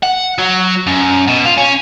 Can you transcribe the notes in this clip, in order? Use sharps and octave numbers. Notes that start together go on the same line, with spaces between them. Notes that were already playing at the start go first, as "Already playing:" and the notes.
F#5
F#3
F#2
B2
F4
C#4